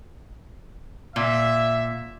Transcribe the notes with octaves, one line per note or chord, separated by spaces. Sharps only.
A#2 E5